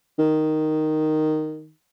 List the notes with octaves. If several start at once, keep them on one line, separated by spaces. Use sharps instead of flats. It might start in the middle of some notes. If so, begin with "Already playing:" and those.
D#3